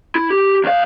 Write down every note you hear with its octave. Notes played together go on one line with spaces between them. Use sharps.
E4
G4
E2 F5